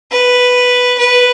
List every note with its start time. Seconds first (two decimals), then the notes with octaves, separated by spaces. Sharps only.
0.12 B4
0.98 B4